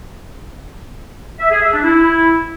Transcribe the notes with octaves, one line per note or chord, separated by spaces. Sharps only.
E5
G#4
E5
D4
E4